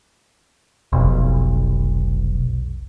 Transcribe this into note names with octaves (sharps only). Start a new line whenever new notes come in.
F1 B1